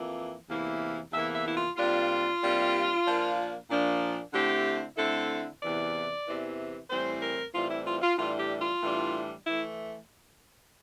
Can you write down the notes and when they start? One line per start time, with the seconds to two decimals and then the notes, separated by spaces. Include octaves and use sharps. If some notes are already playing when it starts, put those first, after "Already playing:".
Already playing: F2 E3 A#3
0.49 E2 C3 E3 A#3 E4
1.13 E2 C3 E3 A#3 E4 E5
1.34 E5
1.47 E4
1.55 F4
1.76 C3 G3 A#3 D4 F4
2.41 C3 G3 A#3 D4
3.05 A#2 F3 A#3 D4
3.69 A#2 F3 A#3 D4
4.33 D3 A3 C4 E4 G4
4.97 D3 A3 C4 E4 A4
5.61 E2 C3 E3 D5
6.26 E2 C3 E3
6.90 A2 E3 G3 C4 C5
7.21 A#4
7.53 A2 E3 G3 C4 F4
7.69 E4
7.86 F4
8.02 F4
8.17 A2 E3 G3 D4 F4
8.39 G4
8.61 F4
8.82 A2 E3 G3 D4
9.45 E3 A3 E4